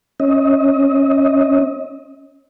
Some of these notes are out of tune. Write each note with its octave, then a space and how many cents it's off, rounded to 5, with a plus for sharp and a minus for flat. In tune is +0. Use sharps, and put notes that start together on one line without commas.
C#4 -15 D#5 +25